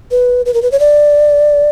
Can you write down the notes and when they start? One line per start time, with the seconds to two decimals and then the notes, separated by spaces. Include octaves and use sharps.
0.11 B4
0.46 B4
0.54 A#4
0.62 B4
0.72 C#5
0.80 D5